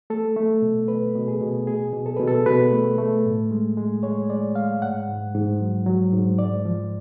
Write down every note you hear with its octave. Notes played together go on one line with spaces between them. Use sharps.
A3 A4
A3
B2
B2 B4
B2
G#4
B2
B2 G#4
B2
A4
B2 B4
A4
B2 B4
A3
A3
A2
G#3
G#3
G#3 C#5
G#3 D5
G#3 F5
G#2 F#5
G#2
G#2
F#3
F#3
G#2
G#2 D5
F3